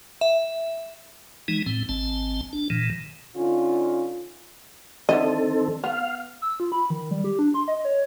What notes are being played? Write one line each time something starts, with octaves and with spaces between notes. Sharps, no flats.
E5
E3 G#3 D#4
A2 C4
G#1 C4 A5
D4
A#2 D#3 E3
D3 C#4 D#4 F4
D3 D#3 C4 E4 A4 D#5
B3 F5
E6
F4
B5
D#3
G3
G4
D4
C6
D#5
C#5